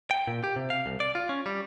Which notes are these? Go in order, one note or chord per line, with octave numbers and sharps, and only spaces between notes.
G5
A#2
G4
C3
F5
C2
D5
F4
C#4
G3